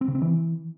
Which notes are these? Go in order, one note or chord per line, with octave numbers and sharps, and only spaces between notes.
C4
C#3
C4
E3